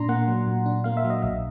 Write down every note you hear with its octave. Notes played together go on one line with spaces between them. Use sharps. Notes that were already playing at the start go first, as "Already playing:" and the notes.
Already playing: A#2 D4 A#5 C6
A#3 F#5
F#3
A#2
D4
A#3 F5
E5
F#3
D#5
B1 E5